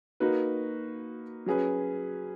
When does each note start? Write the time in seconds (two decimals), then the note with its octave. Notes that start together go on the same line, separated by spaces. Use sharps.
0.20 A#3 D#4 F#4 B4
1.46 F#3 C#4 G#4 B4